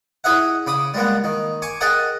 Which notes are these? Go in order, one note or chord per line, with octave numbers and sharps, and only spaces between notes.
E4 G#4 D#5 E5 F#5
C#3 B5 D6 D#6
G3 G#3 A#3 B3
D#3
G#5 C#6 D6
G#4 A#4 D#5 F#5 G5 A5